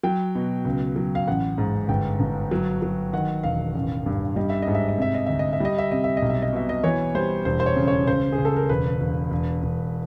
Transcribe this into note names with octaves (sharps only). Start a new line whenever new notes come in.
F#3 G5
B2
C#2
F#3
F5
A1 F#5
G#2
G1 G5
G1
F#3
F#3
D#3 F#5
E1 F5
A1
G2
G3 D#5
E5
D#5
G#2
E5
D#5
C3 E5
D#5
D2 E5
D#5
E5
G3 D#5
E5
C3 D#5
E5
D#5
B1
E5
D#5
B2 E5
D#5
E3 C#5
G3 C5
E1 C5
C5
C#5
C#3
C#5
C#2 C5
G#4
C#2
A4
A#4
E1 B4
E1
E1
E1